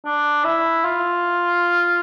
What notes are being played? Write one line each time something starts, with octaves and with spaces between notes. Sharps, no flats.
D4
E4
F4